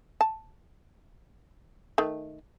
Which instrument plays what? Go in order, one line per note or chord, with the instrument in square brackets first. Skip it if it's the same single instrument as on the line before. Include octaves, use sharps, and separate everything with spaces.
[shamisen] A5
D#3 A3